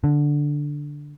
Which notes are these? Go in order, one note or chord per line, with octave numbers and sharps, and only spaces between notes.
D3